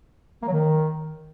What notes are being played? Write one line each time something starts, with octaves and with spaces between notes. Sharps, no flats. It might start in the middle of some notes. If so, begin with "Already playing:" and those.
A#3
F#3
D#3